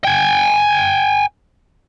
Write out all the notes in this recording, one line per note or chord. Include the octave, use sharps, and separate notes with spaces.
G5 G#5